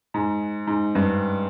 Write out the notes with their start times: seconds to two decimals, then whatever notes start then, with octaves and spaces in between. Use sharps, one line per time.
0.14 G#2
0.67 G#2
0.95 G2